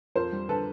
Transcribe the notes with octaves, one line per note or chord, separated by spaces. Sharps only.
F2 A#4 C5
G3
D3 A4 B4